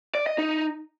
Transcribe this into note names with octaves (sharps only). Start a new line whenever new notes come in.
D5
D#5
D#4